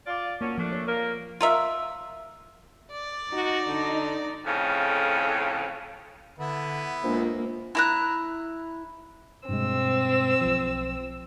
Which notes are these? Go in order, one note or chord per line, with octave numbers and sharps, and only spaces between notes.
F4 D5
F3 F#3 A#3 C#4
F3 A3 D4
C#5
A#3 A#4
F4 A#4 E5
D5
D#4 F#4
D3
F2 A2 C#3
D3 B3 E4 B4
C#2 A#3 D4 F4 C5
E4 A#5 F#6
G2 B2 G#3 C4 E6
B1 F3